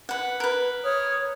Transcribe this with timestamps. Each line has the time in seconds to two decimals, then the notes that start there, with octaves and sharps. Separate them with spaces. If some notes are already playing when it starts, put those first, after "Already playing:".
0.09 B4 F#5
0.40 A#4 B4
0.83 C#5 D#6 F6